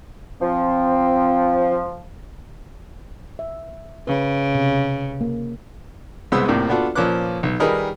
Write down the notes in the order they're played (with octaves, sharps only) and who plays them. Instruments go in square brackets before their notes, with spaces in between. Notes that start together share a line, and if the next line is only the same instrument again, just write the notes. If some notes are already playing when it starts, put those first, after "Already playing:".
[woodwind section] F3 [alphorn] C4
[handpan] E5
[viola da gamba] C#3 [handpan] B4
[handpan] C3
A#3
[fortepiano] C2 G#3 B3 C5 D#6 E6
A2 C3 A#3 D5
B3 D4 F4 F#4 A4
A#2 F3 C#4 B4 D6 F#6
B1
D#3 G3 G#4 A#4 B4 D#5